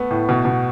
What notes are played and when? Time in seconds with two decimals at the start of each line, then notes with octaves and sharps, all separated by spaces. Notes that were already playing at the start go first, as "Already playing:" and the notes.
Already playing: A3 B3
0.11 A2
0.29 B2
0.45 B2